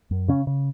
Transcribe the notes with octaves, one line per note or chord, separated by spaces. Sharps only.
F#2
C#3 C#4
C#3